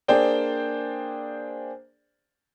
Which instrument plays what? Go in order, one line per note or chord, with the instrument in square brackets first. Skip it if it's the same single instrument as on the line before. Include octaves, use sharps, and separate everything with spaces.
[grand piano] A#3 D4 G#4 C5 D5 G5